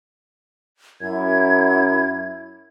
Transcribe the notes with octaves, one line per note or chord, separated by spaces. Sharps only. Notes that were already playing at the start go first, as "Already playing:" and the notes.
F#2 E4 G#6